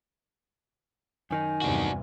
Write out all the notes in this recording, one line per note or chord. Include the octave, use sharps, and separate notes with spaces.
F#2 D#3 D#4 G#5
E2 G2 C3 D4 F#4